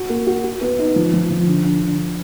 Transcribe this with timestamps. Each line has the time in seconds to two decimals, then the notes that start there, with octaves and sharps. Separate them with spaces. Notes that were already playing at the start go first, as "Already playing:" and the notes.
Already playing: F#4
0.09 A#3
0.27 F#4
0.44 F#4
0.61 B3
0.79 D#4
0.96 F3
1.13 F3
1.30 F3
1.48 D3
1.65 D3
1.82 D3